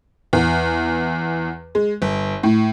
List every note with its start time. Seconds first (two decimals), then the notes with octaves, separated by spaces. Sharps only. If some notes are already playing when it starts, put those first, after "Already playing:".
0.33 E2
1.75 G#3
2.02 G1
2.43 A2